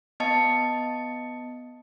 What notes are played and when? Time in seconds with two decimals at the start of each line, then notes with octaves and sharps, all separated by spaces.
0.20 B3 D#5 A5 C#7